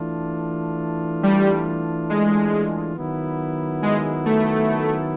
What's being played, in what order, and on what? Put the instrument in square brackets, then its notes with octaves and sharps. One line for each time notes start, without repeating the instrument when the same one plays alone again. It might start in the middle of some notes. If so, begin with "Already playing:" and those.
Already playing: [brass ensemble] E3 A3 D4 F4
[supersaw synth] G3
G#3
[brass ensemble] D#3 F#3 B3 E4
[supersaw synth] G#3
A3